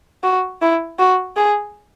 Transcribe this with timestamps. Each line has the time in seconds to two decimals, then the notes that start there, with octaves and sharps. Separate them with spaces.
0.24 F#4
0.62 E4
0.99 F#4
1.36 G#4